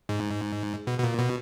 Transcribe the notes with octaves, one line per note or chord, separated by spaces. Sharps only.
G#2
B2
B2
A#2
B2